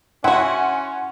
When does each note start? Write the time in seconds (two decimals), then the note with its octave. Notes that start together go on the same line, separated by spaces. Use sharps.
0.24 C#4 E4 F#4 F#5 G#5 C6